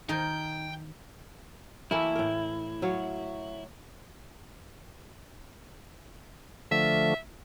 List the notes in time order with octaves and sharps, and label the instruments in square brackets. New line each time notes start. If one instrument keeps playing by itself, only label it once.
[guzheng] D#3 A#4 [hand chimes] D#4 G6 [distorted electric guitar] G5
[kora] E3 A3 A#3 [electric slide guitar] E4
[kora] A2 A#4
F#3 C#5 F5
[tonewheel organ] D3 F3 A3 [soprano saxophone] E5